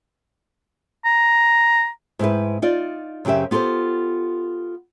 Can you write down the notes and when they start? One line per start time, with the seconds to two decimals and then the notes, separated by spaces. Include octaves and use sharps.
1.05 A#5
2.19 G#2 C4 E4 B4
2.62 D#4 F4 D5
3.25 F#2 C#3 C4 G4 E5
3.51 B3 F4 G4 A4 C5